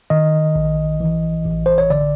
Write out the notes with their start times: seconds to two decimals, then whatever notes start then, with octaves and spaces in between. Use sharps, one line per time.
0.10 D#3 D#5
0.55 A#1
1.00 E3
1.45 A1
1.66 C5
1.78 C#5
1.90 D3 D5